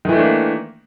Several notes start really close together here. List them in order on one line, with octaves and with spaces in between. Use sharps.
D#3 E3 A3 D4 A#3